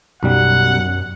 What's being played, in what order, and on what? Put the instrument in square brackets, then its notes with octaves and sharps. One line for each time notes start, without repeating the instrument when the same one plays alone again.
[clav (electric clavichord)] B1 G3 [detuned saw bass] F#2 [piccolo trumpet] F#5